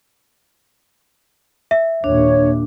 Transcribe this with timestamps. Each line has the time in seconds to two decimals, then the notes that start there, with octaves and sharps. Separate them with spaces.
1.71 E5
2.04 D#2 A#2 D4 C#5